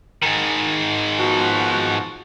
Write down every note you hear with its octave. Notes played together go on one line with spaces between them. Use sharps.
G#2 D#3
F3 B3 F#4